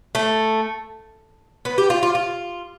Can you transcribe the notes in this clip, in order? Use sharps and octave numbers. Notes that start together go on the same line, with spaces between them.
A3
B3
G4
F4
F4
F4